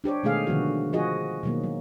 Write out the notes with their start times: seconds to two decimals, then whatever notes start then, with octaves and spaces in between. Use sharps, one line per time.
0.04 D4 G4 C5 C#5
0.23 B2 D#3 G#3 A3 G#4 F5
0.47 B2 D3 D#3 F3 B3 F#4
0.93 F3 F4 F#4 G#4 D#5
1.43 B2 D#3 F#3 A#3
1.64 F#3